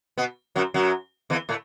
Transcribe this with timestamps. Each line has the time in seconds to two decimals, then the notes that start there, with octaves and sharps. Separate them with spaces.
0.18 B2 B3
0.56 F#2 F#3
0.74 F#2 F#3
1.30 E2 E3
1.49 A2 A3